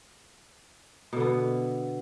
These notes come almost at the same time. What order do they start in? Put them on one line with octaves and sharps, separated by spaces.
B2 D3 B3